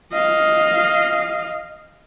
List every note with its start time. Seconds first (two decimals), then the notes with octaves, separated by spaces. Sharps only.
0.13 D#5 F5